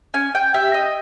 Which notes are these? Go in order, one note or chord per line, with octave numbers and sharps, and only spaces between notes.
C#4 G#5
G5
G4 E5
D#5